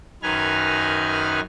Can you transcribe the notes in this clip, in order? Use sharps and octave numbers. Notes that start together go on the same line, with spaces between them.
F#2 D#3 D#4 B4 G#5 F6